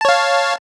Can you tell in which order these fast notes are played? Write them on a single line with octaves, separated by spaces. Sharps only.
A5 C#5 F5